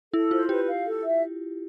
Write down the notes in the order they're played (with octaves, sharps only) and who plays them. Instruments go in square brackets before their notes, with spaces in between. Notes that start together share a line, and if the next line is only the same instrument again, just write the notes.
[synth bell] E4 [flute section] A4
[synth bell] F4 [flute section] C5
[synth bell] G4 [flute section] B4
[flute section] F5
A4
E5